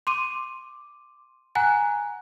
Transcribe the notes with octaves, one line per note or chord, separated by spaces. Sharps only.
C6 D6 D#7
F#5 G#5 A#5 F#6